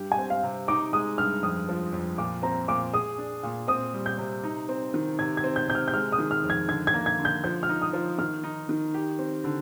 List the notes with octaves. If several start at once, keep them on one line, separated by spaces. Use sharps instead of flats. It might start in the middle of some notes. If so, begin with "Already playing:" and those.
Already playing: G2 G4
G#5
C4
F5
C3
D#4 D6
G#3 D#6
G2 F6
F2 D#6
F3
F2
A#2 D6
C4 A#5
A#2 D6
G#4 D#6
D4
A#2
C4 D#6
G3
G6
C3
D#4
C4
D#3
C3 G#6
G#6
C4
G6
C3 G6
F6
G6
G#3 F6
D#6
D#3
F6
F2
G#6
D3 G#6
G#6
A#3
G#6
D3
G6
F3 G6
F6
D#4
D#6
F3
D#3 F6
D#4
D#3
G4
C4
D3